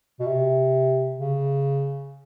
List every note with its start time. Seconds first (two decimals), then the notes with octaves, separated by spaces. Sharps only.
0.19 B2
0.27 C3
1.19 C#3